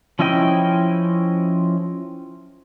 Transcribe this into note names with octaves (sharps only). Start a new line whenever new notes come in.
F3 C#4 E4 D#5 G5